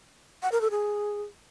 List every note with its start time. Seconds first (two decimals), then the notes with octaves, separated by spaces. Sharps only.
0.43 F#5
0.52 A#4
0.61 A4
0.71 G#4